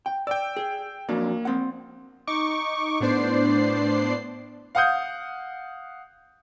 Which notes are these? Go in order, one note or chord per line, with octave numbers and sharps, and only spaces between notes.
G5
D5 G5 E6
G#4
F2 F#3 A#3 D4
C4 F#5
D#4 C#6 D6
A2 B3 D4 C5 D5 C7
F5 F#5 D#6 G6